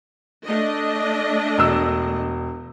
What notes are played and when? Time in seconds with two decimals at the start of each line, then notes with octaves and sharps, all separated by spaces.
0.46 A3 D4 D#5
1.58 E1 E6